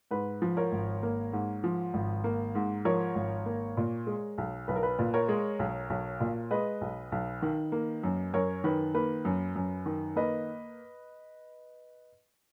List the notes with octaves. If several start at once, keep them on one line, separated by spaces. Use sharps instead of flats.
G#2 B4
F3
A#4 C#5
G#1
A#3
G#2
F3
G#1
A#3
G#2
F3 A#4 C#5
G#1
A#3
A#2
G#3
B1
B1 B4
A#4
B4
A#2
A#4 C#5
G#3
B1
B1
A#2
G#3 B4 D#5
B1
B1
D#3
A#3
F#2
F#2 A#4 C#5
D#3 B4
A#3 B4
F#2
F#2
D#3
A#3 B4 D#5